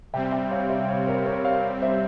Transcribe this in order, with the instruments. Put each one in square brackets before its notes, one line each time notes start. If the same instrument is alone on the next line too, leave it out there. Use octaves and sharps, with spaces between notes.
[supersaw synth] C3 G3 C4 [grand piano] E5 G5
[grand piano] E5 G5
C#5 F5
C5 E5
C#5 F5
A#4 C#5
A#4 C#5
C#5 F5
C5 E5